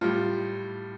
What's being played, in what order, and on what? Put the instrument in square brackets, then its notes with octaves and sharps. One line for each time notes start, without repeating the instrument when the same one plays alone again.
[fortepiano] A2 G3 F4